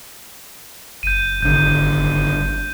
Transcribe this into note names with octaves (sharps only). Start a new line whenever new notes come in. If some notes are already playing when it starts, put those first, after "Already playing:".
F#1 G6 D#7
G#1 D3 G6